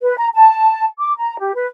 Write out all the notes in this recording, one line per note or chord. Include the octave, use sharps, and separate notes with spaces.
B4
A#5
A5
D6
A#5
G4
B4